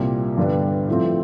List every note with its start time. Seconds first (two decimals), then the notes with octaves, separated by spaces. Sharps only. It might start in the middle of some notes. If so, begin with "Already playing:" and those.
Already playing: C2 A#2 G3
0.37 G2 D3 G3 B3 D4
0.88 A2 F3 A3 C4